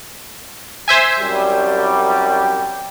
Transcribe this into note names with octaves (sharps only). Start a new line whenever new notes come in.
C5 E5 G#5
C2 F#2 G3